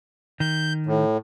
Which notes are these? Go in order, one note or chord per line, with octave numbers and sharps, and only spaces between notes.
D#3 G6
A2